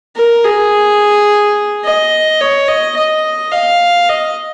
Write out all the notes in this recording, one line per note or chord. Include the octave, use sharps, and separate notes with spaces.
A#4
G#4
D#5
C#5
D#5
D#5
F5
D#5